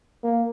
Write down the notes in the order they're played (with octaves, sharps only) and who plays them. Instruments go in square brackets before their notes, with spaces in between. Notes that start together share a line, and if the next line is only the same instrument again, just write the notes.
[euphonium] A#3